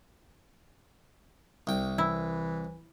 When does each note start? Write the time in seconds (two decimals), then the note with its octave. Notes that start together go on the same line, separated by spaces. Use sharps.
1.67 C2 G5
1.98 E3 E4